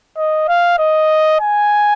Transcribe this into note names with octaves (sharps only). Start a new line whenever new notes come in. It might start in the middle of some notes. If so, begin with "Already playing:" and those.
D#5
F5
D#5
G#5